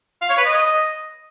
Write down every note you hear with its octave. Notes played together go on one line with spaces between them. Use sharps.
F5
C#5
B4
D#5